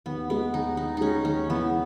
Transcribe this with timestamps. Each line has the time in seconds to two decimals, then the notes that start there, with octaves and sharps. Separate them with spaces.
0.06 D#2 B3
0.30 G#3 B3
0.54 D#2 D#4
0.77 D#3 D#4
0.97 G#3 C#4 D#4
1.25 D#2 C#4
1.50 E3 B3